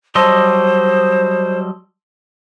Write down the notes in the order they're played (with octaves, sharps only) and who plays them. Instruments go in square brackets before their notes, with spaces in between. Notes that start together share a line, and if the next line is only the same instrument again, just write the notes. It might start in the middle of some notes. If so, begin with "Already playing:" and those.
[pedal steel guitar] F#3 G3 D#5 [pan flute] C5 [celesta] A5 C6 E6